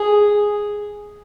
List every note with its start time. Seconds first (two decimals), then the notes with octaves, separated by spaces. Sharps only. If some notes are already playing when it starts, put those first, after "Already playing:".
Already playing: G#4